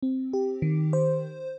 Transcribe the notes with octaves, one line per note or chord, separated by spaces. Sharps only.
C4
G4
D#3
C5